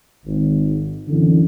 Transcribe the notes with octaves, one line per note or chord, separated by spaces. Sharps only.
G#1
C2 F#2 D3 E3